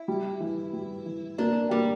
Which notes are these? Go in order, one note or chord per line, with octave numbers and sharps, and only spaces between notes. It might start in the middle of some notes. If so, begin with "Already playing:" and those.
Already playing: E4
G3
E3
G3
E3
A#3 D4
G3 A#3